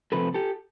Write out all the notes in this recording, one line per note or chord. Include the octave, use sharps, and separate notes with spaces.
C3 F3 A3 C4 A4 B4
G4 A4